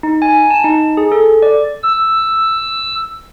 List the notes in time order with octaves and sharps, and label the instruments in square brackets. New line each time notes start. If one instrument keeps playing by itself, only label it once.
[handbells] D#4
G#5
A5
D#4
G#4
A4
D5
[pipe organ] E6